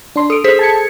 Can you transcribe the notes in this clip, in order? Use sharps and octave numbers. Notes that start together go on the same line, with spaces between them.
D4 C6
A4 D#6 D7
G#4 A4 C5 B6
A5 G#6 C#7